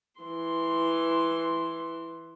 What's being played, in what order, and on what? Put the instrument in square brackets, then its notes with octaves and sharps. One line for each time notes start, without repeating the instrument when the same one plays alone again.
[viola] E3 C6